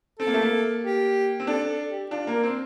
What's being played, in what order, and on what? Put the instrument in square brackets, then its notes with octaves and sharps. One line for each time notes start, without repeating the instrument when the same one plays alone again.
[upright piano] C4 [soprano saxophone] A4
[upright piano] A#3
A3
A#3
[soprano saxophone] G4
[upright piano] C4
[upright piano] D4 [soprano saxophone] A4
[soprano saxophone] A4
G4
[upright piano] D4 [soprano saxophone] F4
[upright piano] A#3 [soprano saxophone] A#4
[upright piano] C4 [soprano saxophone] C5